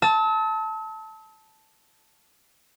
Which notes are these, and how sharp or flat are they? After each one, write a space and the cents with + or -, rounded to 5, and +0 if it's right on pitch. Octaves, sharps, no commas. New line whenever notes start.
A5 +0 E6 -45